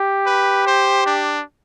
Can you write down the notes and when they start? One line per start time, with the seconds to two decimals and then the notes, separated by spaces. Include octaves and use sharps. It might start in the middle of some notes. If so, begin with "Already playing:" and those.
Already playing: G4
0.26 B4
0.66 C5
1.06 D4